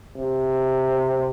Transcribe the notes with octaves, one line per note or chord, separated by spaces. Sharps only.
C3